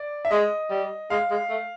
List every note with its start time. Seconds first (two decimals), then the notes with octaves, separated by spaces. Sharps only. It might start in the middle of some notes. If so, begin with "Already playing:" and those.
Already playing: D5
0.25 E5
0.31 G#3 D#5
0.70 G3
1.10 G#3 F5
1.31 G#3
1.50 A3